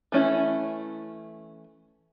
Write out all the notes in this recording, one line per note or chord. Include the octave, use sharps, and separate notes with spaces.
E3 A3 C#4 E4